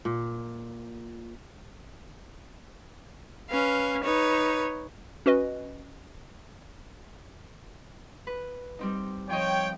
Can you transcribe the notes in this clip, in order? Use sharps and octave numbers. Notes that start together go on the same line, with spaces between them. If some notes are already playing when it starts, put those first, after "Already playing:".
A#2
C#4 B4 F5
D#4 B4 C#5
C#4 F#4 B4 D#5
B4
G3 C4 D#4
F3 C#5 D#5 G5